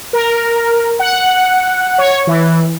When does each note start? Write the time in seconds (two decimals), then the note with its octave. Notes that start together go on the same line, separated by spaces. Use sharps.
0.13 A#4
0.99 F#5
1.98 C#5
2.27 E3